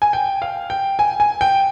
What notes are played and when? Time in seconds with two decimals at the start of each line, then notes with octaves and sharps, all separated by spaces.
0.02 G#5
0.13 G5
0.42 F5
0.70 G5
0.99 G#5
1.20 G#5
1.41 G5